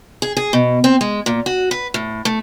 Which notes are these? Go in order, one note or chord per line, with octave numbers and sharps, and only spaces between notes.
G#4
G#4
B2
C4
G#3
A#2
F#4
B4
A2
A3